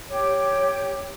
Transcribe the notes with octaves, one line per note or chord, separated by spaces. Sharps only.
G4 C#5